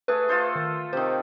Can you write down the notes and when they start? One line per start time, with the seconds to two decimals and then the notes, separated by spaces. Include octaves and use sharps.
0.08 A3 G#4 B4
0.29 F4 A4 C5
0.56 D#3
0.93 C3 D#3 C5